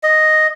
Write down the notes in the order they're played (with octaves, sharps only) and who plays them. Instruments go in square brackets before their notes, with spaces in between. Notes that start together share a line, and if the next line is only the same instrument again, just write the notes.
[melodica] D#5